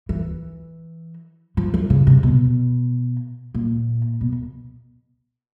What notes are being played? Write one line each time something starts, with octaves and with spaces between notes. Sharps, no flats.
E3
F3
F3
C#3
C3
B2
A#2
B2